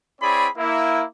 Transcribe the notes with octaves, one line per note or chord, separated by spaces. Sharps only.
C4 E4 G#4 C#5 D5 B5
A#3 E4